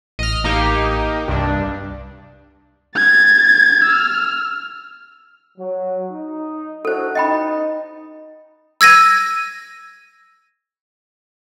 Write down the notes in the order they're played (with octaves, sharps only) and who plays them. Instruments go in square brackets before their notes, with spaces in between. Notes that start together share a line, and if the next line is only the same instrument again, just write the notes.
[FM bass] A1 [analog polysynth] D#5 F6
[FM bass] A1 [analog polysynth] A#3 D#4 G4
[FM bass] C2 [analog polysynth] G2 D4
[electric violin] G#6 A6
E6 F6
[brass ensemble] F#3
D#4
[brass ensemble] D4 E4 F#4 [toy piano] A4 C5
[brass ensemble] D#4 [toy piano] D#5 G5 B5
[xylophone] E6 G#6 A#6 D#7